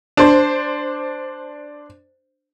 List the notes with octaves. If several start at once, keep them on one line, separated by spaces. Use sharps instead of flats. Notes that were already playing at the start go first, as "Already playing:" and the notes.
D4 C5